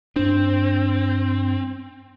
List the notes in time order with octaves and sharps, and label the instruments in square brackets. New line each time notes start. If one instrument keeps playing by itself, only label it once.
[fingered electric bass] G2 D4 [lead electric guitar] C4